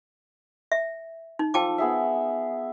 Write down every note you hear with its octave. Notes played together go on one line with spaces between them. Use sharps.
E5
D#4
F3 A4 G5 A5 D6
B3 G#4 E5